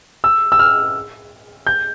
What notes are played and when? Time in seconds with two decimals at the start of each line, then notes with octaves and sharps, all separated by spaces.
0.24 E6
0.52 E6
0.59 F6
1.67 G6